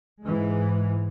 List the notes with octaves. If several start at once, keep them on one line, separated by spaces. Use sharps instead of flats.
G#2 E3 G#3